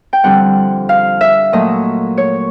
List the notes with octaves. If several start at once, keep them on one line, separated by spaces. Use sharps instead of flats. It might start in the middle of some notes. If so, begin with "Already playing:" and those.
G5
F2 D3 G3 F#5
F5
E5
A#2 F#3 A3 D#5
C#5